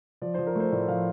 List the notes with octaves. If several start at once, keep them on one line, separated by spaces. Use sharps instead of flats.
F3 D5
F3 C5
A#4
A3 C5
A2 D5
F3 F5